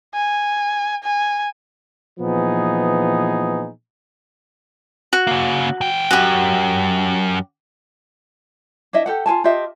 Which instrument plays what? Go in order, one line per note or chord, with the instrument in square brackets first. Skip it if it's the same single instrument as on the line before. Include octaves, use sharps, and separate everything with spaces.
[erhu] G#5
G#5
[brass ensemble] A#2 E3 F3 B3 D#4 G#4
[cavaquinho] F#4
[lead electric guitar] C#3 A#3
E3 G5
[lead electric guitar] F#2 [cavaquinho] F#4 G4
[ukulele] D4 E4 D#5 E5
G4 A4 F#5
F4 A4 G#5 A5
F4 G4 D#5 E5